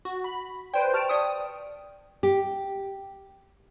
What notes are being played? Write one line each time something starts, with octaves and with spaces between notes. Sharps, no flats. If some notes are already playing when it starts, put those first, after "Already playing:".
F#4
B5
B4 C5 D5 G5
G4 A5 F6 D7
D5 F5 G5 D#6
G4